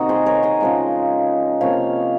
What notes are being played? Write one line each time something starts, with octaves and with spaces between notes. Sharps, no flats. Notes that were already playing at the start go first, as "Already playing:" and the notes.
Already playing: C3 D#3 A#3 D#4 F#4
G#4 C5
A#4 C#5
C5 D#5
C#3 F3 G#3
C3 F3 A#3 C#5 F5